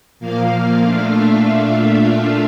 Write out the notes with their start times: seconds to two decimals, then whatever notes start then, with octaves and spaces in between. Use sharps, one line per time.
0.20 A#2 F3 A#3 F5
0.79 A#2 A3 D4 F4 F5
1.09 E5